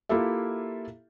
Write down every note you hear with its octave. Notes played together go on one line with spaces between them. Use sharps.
A#3 E4 F4 G4 A4 E5